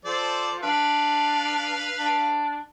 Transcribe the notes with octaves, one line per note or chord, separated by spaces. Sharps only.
F3 A4 C5 D5
D4 B4 F5
D4